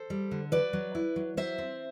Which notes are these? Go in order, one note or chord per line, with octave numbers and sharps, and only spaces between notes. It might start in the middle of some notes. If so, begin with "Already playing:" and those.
Already playing: A4 C5
G3
D3
F#3 B4 D5
F#3
E4
F#3
F#3 C5 E5
C4